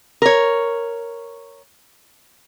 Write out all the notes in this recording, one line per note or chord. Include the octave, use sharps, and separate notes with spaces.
A#4 C#5